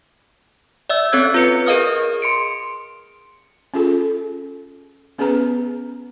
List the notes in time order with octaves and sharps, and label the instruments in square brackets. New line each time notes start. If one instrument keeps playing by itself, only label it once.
[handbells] D5 E5 E6
C4 C#4 A4 C#5 E6 G#6
F4 B4 C#7
G#4 A#4 D#5 F5 D#6 F6
C6 C#7 D7
[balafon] C#4 F4 G#4 A4
B3 C#4 G#4 B4 A#5